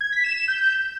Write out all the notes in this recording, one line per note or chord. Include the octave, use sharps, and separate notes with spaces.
G#6
B6
E7
E7
G6